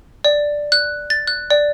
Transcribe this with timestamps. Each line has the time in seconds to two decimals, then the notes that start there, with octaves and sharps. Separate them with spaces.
0.25 D5
0.72 F#6
1.10 A6
1.28 F#6
1.50 D5